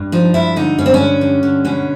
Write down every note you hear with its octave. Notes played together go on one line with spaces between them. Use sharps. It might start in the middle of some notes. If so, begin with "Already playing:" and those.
Already playing: G2
F3 D#4
G2 E4
D3 D#4
G2 C#4
C4
C#4
D3
G2
D3
B2 C#4